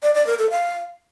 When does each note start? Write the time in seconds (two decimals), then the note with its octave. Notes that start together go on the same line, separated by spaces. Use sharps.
0.03 D5
0.15 D5
0.27 A#4
0.39 A4
0.51 F5